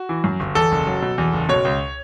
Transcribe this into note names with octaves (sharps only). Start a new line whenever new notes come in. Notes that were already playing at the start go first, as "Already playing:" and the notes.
Already playing: F#4
E3
F#2
G1
E2 A4
F#1
F#3
B2
E2
F#1
B2 C#5
C#2